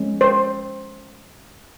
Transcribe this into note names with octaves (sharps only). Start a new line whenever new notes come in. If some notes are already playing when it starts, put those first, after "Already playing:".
Already playing: F3 G#3 C#4
C5